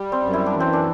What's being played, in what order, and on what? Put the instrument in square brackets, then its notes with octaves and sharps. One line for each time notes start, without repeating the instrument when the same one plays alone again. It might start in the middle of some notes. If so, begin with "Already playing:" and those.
Already playing: [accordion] G3
[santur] C4
[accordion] F#2
[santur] E4
D4
[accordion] E3
[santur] C4
D4